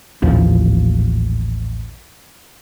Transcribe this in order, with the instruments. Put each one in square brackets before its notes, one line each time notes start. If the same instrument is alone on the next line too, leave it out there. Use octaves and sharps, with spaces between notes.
[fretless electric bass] A1 D#2 A#2 F3